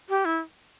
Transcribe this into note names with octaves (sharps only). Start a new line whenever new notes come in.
G4
E4